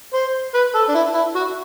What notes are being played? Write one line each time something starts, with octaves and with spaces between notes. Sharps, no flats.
C5
B4
A4
D4
E4
E4
F#4